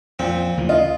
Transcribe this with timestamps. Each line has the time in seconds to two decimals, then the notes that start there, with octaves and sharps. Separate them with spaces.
0.19 F2 A#2 C4
0.57 D2 C#3 E3
0.69 F4 D#5